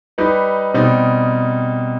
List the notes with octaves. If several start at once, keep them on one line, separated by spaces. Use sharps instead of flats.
G3 D#4 G4 B4 D#5
B2 G3 C4 D#4